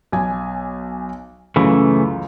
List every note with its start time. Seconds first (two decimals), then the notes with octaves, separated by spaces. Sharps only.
0.12 B1 G#5
1.56 C#2 F#2 C#3 E3 A3